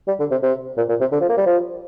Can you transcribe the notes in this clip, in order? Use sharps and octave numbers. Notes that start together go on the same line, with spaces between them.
G3
D3
C3
C3
A#2
A#2
C3
D3
F3
A#3
G3
F3